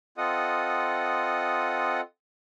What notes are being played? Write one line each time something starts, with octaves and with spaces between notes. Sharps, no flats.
C4 F4 A4 D#5 F#5 D#6